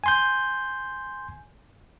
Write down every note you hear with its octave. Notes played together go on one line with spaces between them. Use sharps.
G#5 C6 G6